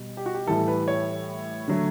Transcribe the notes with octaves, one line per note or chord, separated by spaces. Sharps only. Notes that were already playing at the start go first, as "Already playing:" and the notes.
Already playing: B2 G3
G4
F#4
G4
A2 E3 G3 A4
B4
C#5
D3 F#3 A3